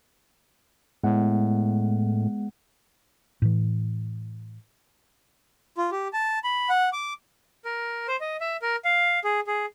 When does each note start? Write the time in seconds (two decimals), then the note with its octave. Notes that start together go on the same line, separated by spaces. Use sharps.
1.04 A2 G#3 B3 F#5
3.42 A2 E3
5.76 F4
5.92 G4
6.13 A5
6.44 B5
6.69 F#5
6.93 D6
7.65 A#4
8.08 C5
8.21 D#5
8.40 E5
8.62 A#4
8.85 F5
9.24 G#4
9.47 G#4